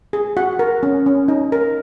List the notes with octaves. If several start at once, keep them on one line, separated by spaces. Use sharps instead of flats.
G#4
F#4 F#5
A#4
C#4
C#4
D#4
A#4